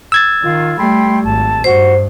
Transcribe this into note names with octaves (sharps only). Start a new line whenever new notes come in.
E6 G#6 A6
D#3 F4
G3 A3 G5 B5 C6
G#1 A5
G2 F#4 C5